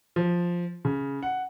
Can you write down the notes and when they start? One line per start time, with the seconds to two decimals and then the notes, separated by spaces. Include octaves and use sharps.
0.16 F3
0.85 C#3
1.23 F#5